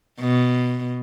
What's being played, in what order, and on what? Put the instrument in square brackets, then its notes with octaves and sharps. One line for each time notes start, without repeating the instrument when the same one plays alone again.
[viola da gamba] B2